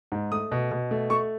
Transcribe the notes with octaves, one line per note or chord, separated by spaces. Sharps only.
G#2
A3 D#6
B2
B2
A3
A3 C#6